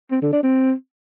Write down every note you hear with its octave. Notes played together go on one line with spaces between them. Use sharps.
C4
D3
D4
C4